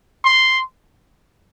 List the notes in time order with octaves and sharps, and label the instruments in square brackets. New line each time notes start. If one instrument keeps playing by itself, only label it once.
[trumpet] C6